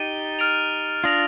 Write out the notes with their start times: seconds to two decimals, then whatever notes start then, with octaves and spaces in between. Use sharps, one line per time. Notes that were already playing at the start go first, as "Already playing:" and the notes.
Already playing: D#4 G4 A6 D#7 G7
0.39 F6 A6 D7 F7
1.04 D4 F4 D#6 A#6 F7